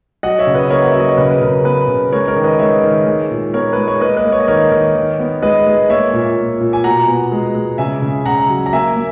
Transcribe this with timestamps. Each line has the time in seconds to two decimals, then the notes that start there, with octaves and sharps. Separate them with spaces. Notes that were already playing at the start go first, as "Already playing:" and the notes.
0.23 F#3 D#5 F#5
0.39 C#5 E5
0.47 C#3
0.54 B4 D#5
0.70 A#3 A#4 C#5
0.82 F#5
0.91 F#3 E5
1.00 D#5
1.08 C#5
1.17 C#3 B4
1.31 B4
1.41 C#3 A#4
1.65 B3 B4
1.88 C#3
2.12 G#3 A#4 C#5
2.28 A#4 C#5
2.36 D#3
2.44 B4 D#5
2.59 G#3 C#5 E5
2.83 D#3
3.06 G#3
3.30 A#2
3.53 B3 A#4 C#5
3.73 G#3 B4
3.88 C#5
4.01 A#3 B4 D#5
4.16 B4 D#5
4.24 A#3
4.32 C#5
4.40 D#5
4.48 D#3 A#4 C#5
4.72 D#3
4.95 D#3
5.19 B3
5.42 G#3 B4 D#5
5.66 G#3
5.90 A#3 C#5 E5
6.13 A#2
6.37 A#2
6.61 A#2
6.73 G#5
6.84 B2 F#5 A#5
7.07 B3
7.32 G#3
7.55 G#3
7.78 C#3 E5 G#5
8.02 C#3
8.26 C#3 F#5 A#5
8.49 F#3
8.66 A#5
8.73 A#3 E5 G#5
8.96 A#3